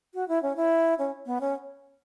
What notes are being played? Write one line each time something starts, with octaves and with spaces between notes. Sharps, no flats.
F#4
E4
C#4
E4
C#4
B3
C#4